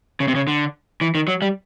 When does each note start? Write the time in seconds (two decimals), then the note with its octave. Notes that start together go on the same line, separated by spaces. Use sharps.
0.20 C#3
0.28 C3
0.35 C#3
0.47 D3
1.01 E3
1.15 D#3
1.28 F#3
1.42 G3